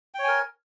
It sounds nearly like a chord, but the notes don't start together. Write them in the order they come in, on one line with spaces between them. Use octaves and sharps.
G5 C#5 G#5 A#4